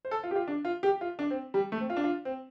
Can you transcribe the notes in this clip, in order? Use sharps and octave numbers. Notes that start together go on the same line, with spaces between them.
C5
A4
F4
G4
F4
D4
F4
G4
F4
D4
C4
G3
A3
C4
F4
D4
F4
C4